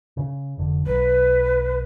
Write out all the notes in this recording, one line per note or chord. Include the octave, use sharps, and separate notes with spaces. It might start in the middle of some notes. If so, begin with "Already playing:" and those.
C#3
F1 D3
B1 F#3 B4